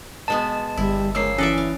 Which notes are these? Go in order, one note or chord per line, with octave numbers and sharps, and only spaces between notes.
B2 G#3 B3 A5
G1 G3 E4
C#3 F3 G#3 A#3 E6 C7
E3 C#4 A4 D5 E5
F5